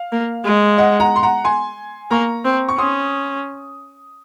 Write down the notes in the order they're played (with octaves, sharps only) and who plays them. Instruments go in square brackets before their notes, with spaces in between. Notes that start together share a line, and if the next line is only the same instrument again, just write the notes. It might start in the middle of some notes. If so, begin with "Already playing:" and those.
Already playing: [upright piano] F5
[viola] A#3
G#3
[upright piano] D#5 F#5
F#5 A#5
C6
F#5 A#5
G#5 C6
[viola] A#3 [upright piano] A#5 C#6
[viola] C4
[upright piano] C#6
[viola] C#4 [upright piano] C6 D#6